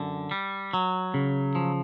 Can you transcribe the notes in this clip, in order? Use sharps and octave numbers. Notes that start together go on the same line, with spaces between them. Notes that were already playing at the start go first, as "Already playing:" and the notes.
Already playing: F#2 D3
G3
F#3
C#3
F3